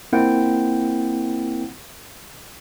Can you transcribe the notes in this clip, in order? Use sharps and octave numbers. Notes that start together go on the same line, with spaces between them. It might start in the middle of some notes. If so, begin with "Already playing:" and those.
A#3 C4 E4 F4 F#5 G5